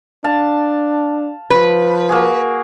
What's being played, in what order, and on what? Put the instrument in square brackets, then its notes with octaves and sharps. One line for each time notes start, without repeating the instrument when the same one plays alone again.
[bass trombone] D4 [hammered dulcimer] F5 A5
[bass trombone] F3 [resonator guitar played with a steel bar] B4
[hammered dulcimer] A#3 F#4 G#4